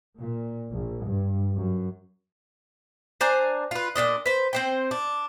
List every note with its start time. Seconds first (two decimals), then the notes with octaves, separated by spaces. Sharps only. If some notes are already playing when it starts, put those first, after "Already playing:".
0.18 A#2
0.72 A#1
1.06 G2
1.55 F#2
3.21 D4 C5 G#5 A#5
3.71 F4 B4
3.96 A#2 C#3 D4 D#5
4.26 B4 C5
4.53 C4 C5 G5
4.91 D4